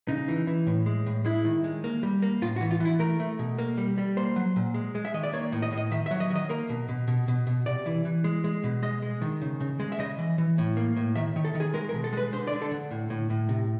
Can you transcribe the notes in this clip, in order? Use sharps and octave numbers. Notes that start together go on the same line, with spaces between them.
C#3 D#4
E3
E3
A2
G#3
A2
G#3 E4
D#3
G#3
A#3
G3
A#3
A2 F4
F#4
E3
F4
E3 E4
A3 A#4
A3
B2
A#3
G3
G3
A#3 C5
F#3
A#2
G#3
G#3
E5
D#3 D#5
D5
A#3 C#5
A2
D#5
A2
D#5
D#3 E5
E5
F#3
D#5
D#3
D#5
A#3 A#4
B2
B2
B2
B2
B2
C3 D5
E3
E3
G#3
G#3
B2
G#3 D#5
G#3
D#3
C#3
C#3
G#3
E5
C#3 D#5
E3
E3
A2
A#3
A2
D#3 E5
D#3
A4
D#3
G#4
G#3 A#4
A#4
B2
A4
G#3 B4
D3 C5
D5
D3
A4
D3
A2
A2
A2
C3